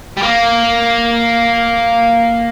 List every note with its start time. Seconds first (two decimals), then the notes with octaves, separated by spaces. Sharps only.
0.17 G3
0.22 A#3